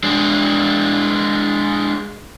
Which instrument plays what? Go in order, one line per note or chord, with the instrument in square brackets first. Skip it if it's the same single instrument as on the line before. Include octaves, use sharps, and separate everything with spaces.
[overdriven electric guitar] G#3 D4